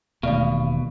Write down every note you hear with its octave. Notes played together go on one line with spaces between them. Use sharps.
E1 D#2 B2 A3 D5 F5